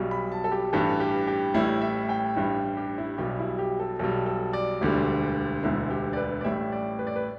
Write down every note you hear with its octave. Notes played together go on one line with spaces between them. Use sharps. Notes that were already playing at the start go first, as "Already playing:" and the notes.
Already playing: B1 B2 G3
B5
A5
A4
G4
A1 G2 E3 G3 A4
G4
G4
A1 A2 G3 E4
E5
G5
A1 G2 G3 E4
G4
E4
B1 B2 G3 G4
E4
G4
A4
B1 B2 G3 A4
A4
D5
E1 D2 D3 G3
E1 D2 D3 E4
G4
D5
B4
D5
A1 A2 G3 E5
D5
B4
D5
B4